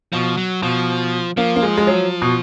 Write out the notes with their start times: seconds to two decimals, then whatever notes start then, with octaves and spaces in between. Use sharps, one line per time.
0.13 B2 F3
0.37 F#3
0.62 B2 F3
1.37 F3 A#3
1.56 A#3
1.63 G#3
1.78 G#3
1.87 F#3
2.22 B2